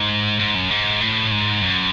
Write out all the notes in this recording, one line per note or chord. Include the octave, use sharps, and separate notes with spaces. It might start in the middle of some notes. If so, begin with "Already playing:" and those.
Already playing: G#2
G#2
F#2
G#2
A2
G#2
F#2